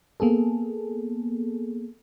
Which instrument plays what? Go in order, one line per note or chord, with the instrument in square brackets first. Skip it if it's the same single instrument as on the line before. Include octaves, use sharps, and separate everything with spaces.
[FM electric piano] A#3 B3 G#4 A4